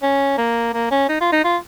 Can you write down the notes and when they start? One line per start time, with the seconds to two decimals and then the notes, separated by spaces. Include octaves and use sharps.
0.03 C#4
0.38 A#3
0.74 A#3
0.91 C#4
1.09 D#4
1.21 F4
1.32 D#4
1.44 F4